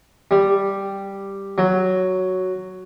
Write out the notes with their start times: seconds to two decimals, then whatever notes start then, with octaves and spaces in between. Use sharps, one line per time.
0.31 G3
1.58 F#3